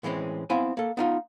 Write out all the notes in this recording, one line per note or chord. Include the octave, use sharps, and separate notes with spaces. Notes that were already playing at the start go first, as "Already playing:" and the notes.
A2 E3 G#3 C4 C#4
B3 C4 E4 F5 G#5
A#3 A4
B3 D#4 F4